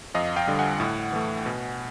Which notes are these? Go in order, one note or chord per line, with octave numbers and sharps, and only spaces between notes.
F2 D#5 F5
F5 G5
D3 G3
F#5 G#5
A2
E3 A3
B2